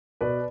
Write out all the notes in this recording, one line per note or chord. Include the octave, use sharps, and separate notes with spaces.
B2 B4 D5